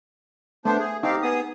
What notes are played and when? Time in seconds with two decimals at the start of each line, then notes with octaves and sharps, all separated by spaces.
0.65 A3 B3 D4 C5
0.79 G#4
1.03 C4 D#4 G4 F5
1.23 B3 G#4 D#6